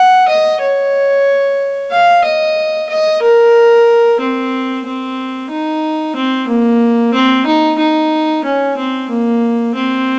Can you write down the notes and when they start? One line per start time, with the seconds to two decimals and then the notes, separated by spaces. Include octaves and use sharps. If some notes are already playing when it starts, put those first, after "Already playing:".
Already playing: F#5
0.28 D#5
0.61 C#5
1.91 F5
2.24 D#5
2.89 D#5
3.22 A#4
4.20 C4
4.85 C4
5.50 D#4
6.16 C4
6.48 A#3
7.14 C4
7.46 D#4
7.78 D#4
8.44 C#4
8.77 C4
9.09 A#3
9.75 C4